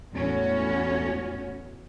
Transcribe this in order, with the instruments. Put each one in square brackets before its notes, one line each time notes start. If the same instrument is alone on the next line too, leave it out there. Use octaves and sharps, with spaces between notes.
[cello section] E2 A2 C#4 F#4